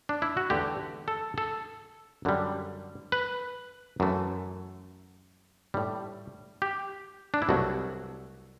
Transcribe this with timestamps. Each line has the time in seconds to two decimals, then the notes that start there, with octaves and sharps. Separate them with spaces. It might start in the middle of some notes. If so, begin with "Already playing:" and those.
0.09 D4
0.22 E4
0.37 F#4
0.50 E2 D3 A3 G4
1.08 A4
1.38 A4
2.25 F#2 D3 G3
3.12 B4
4.00 F#2 E3 A3
5.74 A2 G3
6.62 G4
7.34 D4
7.42 E4
7.49 C2 B2 F#3 A3 F#4